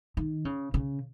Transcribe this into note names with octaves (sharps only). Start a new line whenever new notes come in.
D#3
C#3
C#3